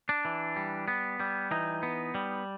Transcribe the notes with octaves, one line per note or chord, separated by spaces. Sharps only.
D4
E3
G3
B3
G3
E3 D#4
B3
G3